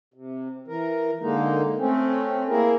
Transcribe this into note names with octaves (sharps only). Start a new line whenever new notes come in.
C3
E3 A#4
D3 G#3 A#3 D#4
A3 C4 C#4
A#3 E4 G#4 A#4